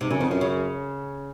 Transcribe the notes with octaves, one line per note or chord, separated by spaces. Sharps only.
G#2 C3
F#2 C#3
F2 D#3
F#2 F3
C#3